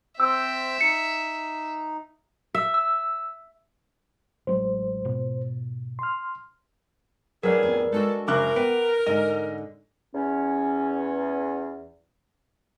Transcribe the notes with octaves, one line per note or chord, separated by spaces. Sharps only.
C4 C5 E5 G5 E6
D#4 C#7
E5
E6
A1 F#3 G#3 C5
G#2 B2
C6 F6
D2 A2 F#3 D4 G#4 A#4 B4 D5
F2 B3 A5
G#3 D4 F#4 A4
F#1 A#4 D6 F#6
B3 B4 F#5 G5 D7
G#2 D3 D#5
E2 C#4